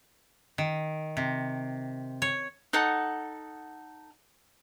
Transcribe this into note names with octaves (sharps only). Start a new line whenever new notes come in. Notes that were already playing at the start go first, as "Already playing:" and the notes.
D#3
C3
C#5
D#4 A4 F#5 D#6